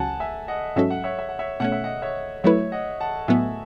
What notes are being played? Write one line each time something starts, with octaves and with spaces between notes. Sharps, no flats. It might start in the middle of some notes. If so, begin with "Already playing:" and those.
Already playing: C#2 C#3 F#3 C#4 F#5 G#5 A5
E5 G#5
D#5 F#5
G#2 F#3 C#4 F#4 A4 E5
F#5
C#5 E5
E5
F#5
C#5 E5
B2 A3 C#4 F#5
E5
D#5 F#5
C#5 E5
F#3 A3 E4 B4 C#5 E5
D#5 F#5
F#5 A5
A2 F#3 B3 E5 G#5